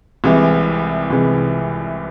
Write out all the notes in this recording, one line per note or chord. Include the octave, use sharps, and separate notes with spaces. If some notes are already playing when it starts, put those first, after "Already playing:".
C2 C3 E3 G#3
C2 C3 E3 G#3